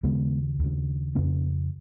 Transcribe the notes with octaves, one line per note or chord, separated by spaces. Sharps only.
D#2 C#3 G#3 B3
D#2 C#3
F2 C#3 A#3 C#4